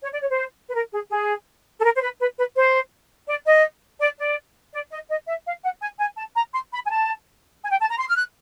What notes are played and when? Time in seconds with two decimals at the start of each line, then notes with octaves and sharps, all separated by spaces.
0.02 C#5
0.12 D5
0.21 C#5
0.29 C5
0.68 B4
0.74 A#4
0.92 G#4
1.11 G#4
1.79 A4
1.84 A#4
1.96 C5
2.01 B4
2.19 B4
2.37 B4
2.55 C5
3.29 D5
3.46 D#5
4.00 D5
4.18 D5
4.73 D5
4.90 D#5
5.09 D#5
5.27 E5
5.45 F5
5.63 F#5
5.81 G#5
5.99 G#5
6.17 A5
6.36 A#5
6.53 C6
6.72 B5
6.85 G#5
6.89 A5
7.63 G#5
7.71 G5
7.81 A5
7.90 A#5
7.98 C6
8.08 F6
8.16 F#6